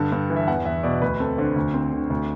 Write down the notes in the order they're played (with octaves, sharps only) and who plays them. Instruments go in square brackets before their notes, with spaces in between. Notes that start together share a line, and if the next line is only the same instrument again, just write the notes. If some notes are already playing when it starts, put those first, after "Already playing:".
Already playing: [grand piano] G2 D3 A5
G2
E3
E5
E2 F#5
E2 E5
B2 D5
D2 B4
C4 A4
D3 C5
D2
C4
D3
D2